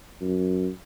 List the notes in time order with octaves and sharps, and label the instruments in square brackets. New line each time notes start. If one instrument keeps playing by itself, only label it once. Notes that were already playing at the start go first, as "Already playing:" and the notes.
[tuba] F#2